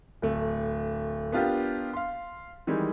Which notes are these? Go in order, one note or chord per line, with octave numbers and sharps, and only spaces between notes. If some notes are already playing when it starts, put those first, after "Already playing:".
D1 A3
B3 D4 F4 G4 A#4
F5 C6
D#3 E3 G3 G#3